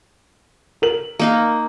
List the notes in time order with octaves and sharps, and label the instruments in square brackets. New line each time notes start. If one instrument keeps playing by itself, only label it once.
[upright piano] A#4 F#7
[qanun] A#3 D#4 F5